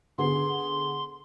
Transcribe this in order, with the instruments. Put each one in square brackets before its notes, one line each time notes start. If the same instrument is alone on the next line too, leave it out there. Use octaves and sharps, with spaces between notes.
[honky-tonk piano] D3 B3 G#4 [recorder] C6